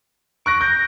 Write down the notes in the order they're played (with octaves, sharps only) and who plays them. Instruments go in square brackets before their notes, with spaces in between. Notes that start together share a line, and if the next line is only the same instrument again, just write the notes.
[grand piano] C#6 F#6 A#6 [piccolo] D7
[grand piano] G6 [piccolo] A#6